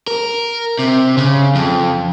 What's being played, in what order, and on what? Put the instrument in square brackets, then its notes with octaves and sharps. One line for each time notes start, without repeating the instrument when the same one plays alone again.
[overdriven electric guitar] A#4
C3
C#3
F2